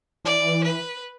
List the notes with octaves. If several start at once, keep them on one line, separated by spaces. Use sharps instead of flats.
E3 D5
B4